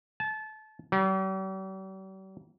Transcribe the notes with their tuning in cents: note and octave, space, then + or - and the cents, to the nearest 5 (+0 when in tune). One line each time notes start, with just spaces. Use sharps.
A5 -25
G3 -45